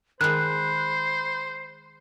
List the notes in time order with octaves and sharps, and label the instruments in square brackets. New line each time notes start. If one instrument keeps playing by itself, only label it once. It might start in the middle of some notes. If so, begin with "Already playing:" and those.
[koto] D#3 G#3 [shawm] C5 [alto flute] B5 [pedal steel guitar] F#6